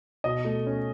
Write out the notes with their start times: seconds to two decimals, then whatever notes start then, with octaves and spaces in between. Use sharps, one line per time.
0.24 B2 D#5
0.45 A3
0.67 C#4